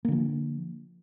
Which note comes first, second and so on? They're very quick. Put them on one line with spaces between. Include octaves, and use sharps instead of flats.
A#3 D3 F3